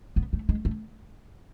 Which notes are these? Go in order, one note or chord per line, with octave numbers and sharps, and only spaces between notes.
B3
A3
G#3
A3